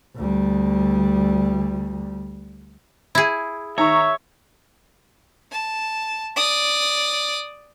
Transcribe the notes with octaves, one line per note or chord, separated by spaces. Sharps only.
D2 G3
E4 G#4
D#3 C#5 E5 A#5 C#6
A5
D5 D#6